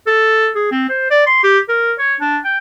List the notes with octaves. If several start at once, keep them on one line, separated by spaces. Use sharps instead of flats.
A4
G#4
C4
C5
D5
C6
G4
A#4
C#5
D4
G5